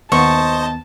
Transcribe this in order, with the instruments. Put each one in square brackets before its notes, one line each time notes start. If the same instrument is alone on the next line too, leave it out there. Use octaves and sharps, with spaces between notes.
[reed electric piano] D#2 B3 [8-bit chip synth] C5 D#5 [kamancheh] A5 [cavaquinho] C#6